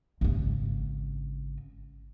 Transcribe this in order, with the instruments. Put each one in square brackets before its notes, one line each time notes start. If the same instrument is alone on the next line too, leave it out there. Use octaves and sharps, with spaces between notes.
[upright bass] G#1 C#3